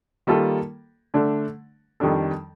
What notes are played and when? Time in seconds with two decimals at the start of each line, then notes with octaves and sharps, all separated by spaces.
0.27 D#3 G3 A#3 F4 A4
1.14 D3 A3 D4
2.00 F2 D#3 G3 D4 A4